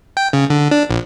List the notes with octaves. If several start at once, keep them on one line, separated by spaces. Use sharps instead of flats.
G5
C#3
D3
D4
A#1